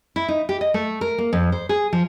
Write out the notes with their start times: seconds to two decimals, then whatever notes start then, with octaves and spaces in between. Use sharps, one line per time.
0.16 E4
0.28 D#4
0.49 G4
0.61 D#5
0.74 A3
1.01 A#4
1.18 A#3
1.33 F2
1.52 C5
1.69 G#4
1.93 F3